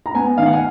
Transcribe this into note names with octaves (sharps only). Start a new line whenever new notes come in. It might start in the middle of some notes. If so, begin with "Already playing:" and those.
A#5
B3 G#5
D#3 F5
F#5
G#5